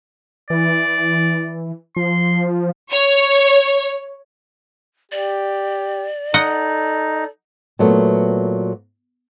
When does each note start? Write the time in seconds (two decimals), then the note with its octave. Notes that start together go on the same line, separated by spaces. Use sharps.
0.50 E3 D5
1.96 F3 C6
2.90 C#5
5.12 G4 D5
6.34 D#4 A4 D#5 F#5
7.79 A#2 F#3 A3 B3